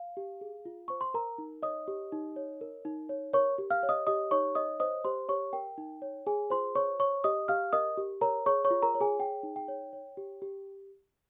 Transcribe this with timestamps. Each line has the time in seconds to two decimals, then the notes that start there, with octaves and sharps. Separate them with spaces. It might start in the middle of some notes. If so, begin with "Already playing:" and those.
Already playing: F5
0.17 G4
0.41 G#4
0.65 F4
0.88 C5 C#6
1.01 C6
1.14 A#4 A#5
1.38 D#4
1.63 C#5 D#5 D#6
1.88 G4
2.12 D#4
2.36 C#5
2.61 A#4
2.85 D#4
3.09 C#5
3.33 A#4 C#5 C#6
3.58 G4
3.70 F5 F6
3.83 C#5
3.89 D#5 D#6
4.07 G4 D#5 D#6
4.31 D#4 C#5 C#6
4.55 C#5 D#5 D#6
4.80 C5 D#5 D#6
5.05 G4 C5 C6
5.29 G4 C#5 C#6
5.53 A#4 G5
5.78 D#4
6.02 C#5
6.27 G#4 G#5
6.50 F4 C5 C6
6.75 C5 C#5 C#6
7.00 C#5 C#6
7.24 G4 D#5 D#6
7.48 G4 F5 F6
7.73 A#4 D#5 D#6
7.97 G4
8.21 A#4 C#5 A#5
8.46 G#4 C#5 C#6
8.65 C#5 C#6
8.71 F4
8.82 A#4 A#5
8.95 C#5
9.01 G#4 G#5
9.19 G#4 G5
9.43 D#4
9.56 G5
9.68 C#5
9.93 C#5
10.17 G4
10.42 G4